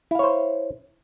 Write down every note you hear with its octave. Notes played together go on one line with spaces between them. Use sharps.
E4 C5 C#5 F5